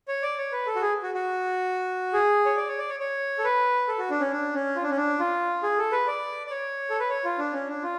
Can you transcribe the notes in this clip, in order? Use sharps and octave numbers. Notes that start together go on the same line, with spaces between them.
C#5
D5
C#5
B4
A4
F#4
G#4
F#4
F#4
G#4
C#5
D5
C#5
D5
C#5
C#5
A4
B4
A4
F#4
D4
C#4
D4
C#4
F4
D4
C#4
D4
F4
G#4
A4
B4
D5
D5
C#5
A4
B4
C#5
F4
D4
C#4
D4
F4